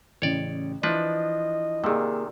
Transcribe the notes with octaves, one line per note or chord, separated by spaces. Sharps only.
A1 C#3 C#5 D5
E3 F3 D4 B4 D#5
C3 D#3 A#3 F4 G4 G#4 D5 E6